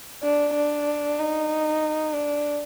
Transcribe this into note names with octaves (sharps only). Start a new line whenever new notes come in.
D4
D4
D#4
D4